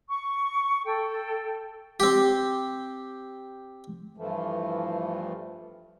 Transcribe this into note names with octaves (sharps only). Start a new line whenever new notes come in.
C#6
A4 G5
C4 G4
G2 E3 F3 A3